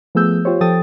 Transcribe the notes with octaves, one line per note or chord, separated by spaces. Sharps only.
F3 A3 B3 G#4 E6 G6
F4 G4 C5 C#5
F3 A4 G5 D#6 A6